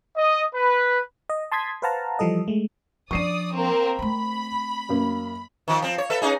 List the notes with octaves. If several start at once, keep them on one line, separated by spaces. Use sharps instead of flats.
D#5
B4
D#5
A5 C6 D#6 G#6 B6
B4 C5 F5 F#5 A5 A#5
E3 F3 G3 A4 D#5
G#3 A3
F3 D4 D5 C#6 D#6 C7 D#7
A#3 C4 A#4
A3 C4 B5
F#2 A#3
D#3 F3
F3 C4
C#5
A4 B4 E5
C#4 D#4 G#4